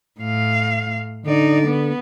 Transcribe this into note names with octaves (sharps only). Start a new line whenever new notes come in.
A2 F5
D3 D#4 D5
B3